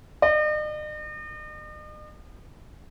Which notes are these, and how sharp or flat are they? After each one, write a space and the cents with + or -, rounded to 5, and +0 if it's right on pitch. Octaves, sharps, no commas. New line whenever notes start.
D#5 -45